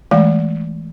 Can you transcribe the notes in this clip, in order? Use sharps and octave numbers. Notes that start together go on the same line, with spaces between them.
E3 G#3 A3 F5